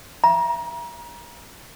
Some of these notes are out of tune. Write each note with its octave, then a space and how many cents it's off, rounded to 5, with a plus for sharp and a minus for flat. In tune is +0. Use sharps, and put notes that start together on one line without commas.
E5 +30 A#5 +30